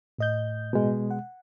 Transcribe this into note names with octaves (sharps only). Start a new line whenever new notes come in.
A2 D#5 G6
B2 G#3
F#5